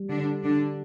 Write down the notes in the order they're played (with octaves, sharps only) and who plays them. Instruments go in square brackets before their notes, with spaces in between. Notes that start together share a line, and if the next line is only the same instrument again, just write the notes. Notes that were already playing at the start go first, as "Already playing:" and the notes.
Already playing: [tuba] G3
[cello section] D3 D4
D3 D4